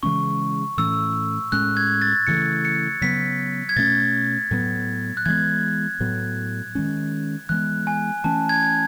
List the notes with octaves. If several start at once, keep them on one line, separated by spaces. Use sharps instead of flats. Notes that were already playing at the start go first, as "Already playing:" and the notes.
C#3 E3 G#3 C#4 C#6
A2 E3 A3 C#4 E6
A2 G#3 C#4 F#6
G#6
A6
C#3 E3 A3 C#7
C#7
C#3 F#3 B3 B6
G#6
B2 A3 C#4 A6
A2 F#3 B3
F#6
E3 G#3 B3 G#6
A2 F#3 B3
D#3 G#3 C#4
E3 G#3 B3 F#6
G#5
E3 A3 C#4 A5
G#6